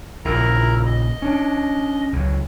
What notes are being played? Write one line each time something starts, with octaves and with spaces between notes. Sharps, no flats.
A#1 A#2 C#3 E4 A#4 A#5
D#5
C#4 D4
C#2 F#3